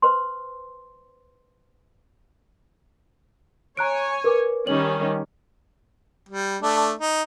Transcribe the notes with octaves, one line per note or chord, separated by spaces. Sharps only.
B4 C5 C6
C#5 G#5 A#5 F#6 D7
A#4 B4 D6
D#3 G3 C#4 C#5 F#7
G3
A3 D4
D#4